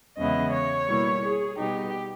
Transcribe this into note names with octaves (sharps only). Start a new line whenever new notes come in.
E2 C#3 G#3 B3 E4 D#5
C#5
B2 G3 A#3 E4
G#4
B2 G3 B3 D#4 G4